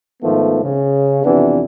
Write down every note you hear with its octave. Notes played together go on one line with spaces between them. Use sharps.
G#2 D#3 F3 A3 B3
C#3
F2 C3 E3 B3 D4